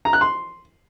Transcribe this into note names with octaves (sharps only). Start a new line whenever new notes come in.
A#5
F#6
C6